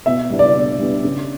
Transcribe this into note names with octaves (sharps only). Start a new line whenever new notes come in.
B2 E5
G3 B3 D4
D5
B2
G3 B3 D4
C#3